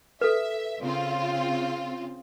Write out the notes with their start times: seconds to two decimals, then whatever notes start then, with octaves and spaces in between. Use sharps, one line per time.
0.21 A4 B4 E5
0.81 C#3 C4 F4